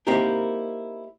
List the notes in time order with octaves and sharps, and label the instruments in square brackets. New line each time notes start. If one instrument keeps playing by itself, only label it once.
[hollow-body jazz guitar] A#3 C4 D#4 E4 G4 A#4